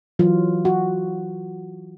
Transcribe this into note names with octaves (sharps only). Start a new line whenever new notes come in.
E3 F#3 F4
F#4